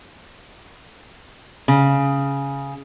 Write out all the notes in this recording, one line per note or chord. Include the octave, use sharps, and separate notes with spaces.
C#3